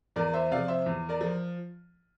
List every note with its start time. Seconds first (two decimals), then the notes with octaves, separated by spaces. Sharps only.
0.16 E2 A#4 D5
0.33 C5 E5
0.51 C3 F3 D5 F5
0.68 C5 E5
0.86 E2
1.09 A#4 D5
1.21 F3